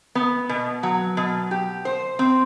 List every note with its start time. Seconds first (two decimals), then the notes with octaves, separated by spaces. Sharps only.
0.15 B3
0.49 B2
0.83 F#3
1.17 B2
1.51 G4
1.85 C5
2.19 C4